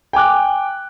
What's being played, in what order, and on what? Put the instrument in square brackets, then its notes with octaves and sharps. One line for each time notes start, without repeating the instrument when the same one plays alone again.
[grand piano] G5 G#5 D6 F#6